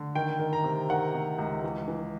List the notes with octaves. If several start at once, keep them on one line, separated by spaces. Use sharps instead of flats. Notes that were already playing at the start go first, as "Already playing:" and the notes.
Already playing: D3
D#3 G5
D#3
A#5
C3
D#3 F#5
C3
C#2
E3
E3